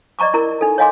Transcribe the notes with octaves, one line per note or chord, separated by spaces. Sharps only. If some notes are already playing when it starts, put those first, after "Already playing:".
D5 D#5 A#5 C#6 D6
E4 A#4 A#5
D#4 A4
C#5 D#5 F5 G#5 C6 D6